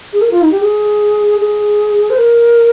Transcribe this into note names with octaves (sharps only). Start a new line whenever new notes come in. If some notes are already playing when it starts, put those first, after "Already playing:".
G#4
A#4
F4
D#4
G4
G#4
G#4
C5
A#4